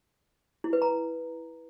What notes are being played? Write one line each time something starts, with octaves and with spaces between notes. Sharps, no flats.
E4
B4
A#5